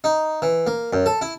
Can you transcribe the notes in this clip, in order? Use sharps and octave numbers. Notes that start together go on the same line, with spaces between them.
D#4
E3
A#3
F#2
A4
E4